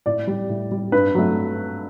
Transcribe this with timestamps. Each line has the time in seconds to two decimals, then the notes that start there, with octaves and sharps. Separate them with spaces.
0.06 A2 D5
0.27 G3
0.49 A2
0.71 G3
0.92 G2 B4
1.15 F#3 A3